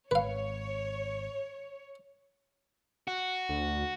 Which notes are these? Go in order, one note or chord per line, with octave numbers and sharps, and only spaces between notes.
G#1 B4 C#5 F5
F#4
D2